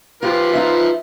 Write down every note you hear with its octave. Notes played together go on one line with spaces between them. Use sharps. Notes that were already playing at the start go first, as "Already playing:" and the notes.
F3 F4 G4 B4
D#4 F4 E5